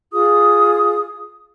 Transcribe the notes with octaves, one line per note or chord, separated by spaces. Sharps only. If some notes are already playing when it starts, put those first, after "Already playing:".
F4 G#4 D#6